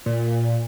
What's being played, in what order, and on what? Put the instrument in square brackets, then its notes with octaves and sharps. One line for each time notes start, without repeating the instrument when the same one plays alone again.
[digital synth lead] A#2